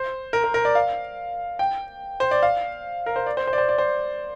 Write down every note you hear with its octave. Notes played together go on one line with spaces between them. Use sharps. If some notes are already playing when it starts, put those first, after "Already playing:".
Already playing: C5
A#4
A#4
A#4
D5
F5
G5
C5
D5
F5
A#4
C5
D5
C5
C5
D5
C5
D5
C5